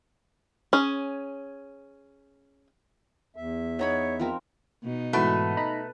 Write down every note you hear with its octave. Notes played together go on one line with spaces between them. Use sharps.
C#4 G#4
E2 E5
B3 D#4 C#5 B5
F3 C4 A#4
B2 D#4
G#2 E3 A3 F#4 B4
D#4 A#5 B5